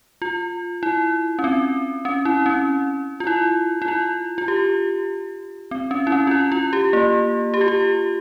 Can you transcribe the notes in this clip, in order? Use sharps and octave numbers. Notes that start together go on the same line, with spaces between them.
F4
E4
C#4
C4
C#4
E4
C#4
F4
E4
E4
F4
F4
G4
C4
C#4
E4
C#4
F4
E4
F4
G4
A#3
G4
F4
G4